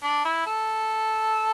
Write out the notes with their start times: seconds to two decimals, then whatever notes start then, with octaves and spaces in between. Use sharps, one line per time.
0.03 D4
0.25 E4
0.46 A4